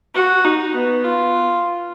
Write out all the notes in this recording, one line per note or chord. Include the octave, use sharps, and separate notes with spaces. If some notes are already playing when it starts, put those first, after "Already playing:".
F#4
D#4
B3
F4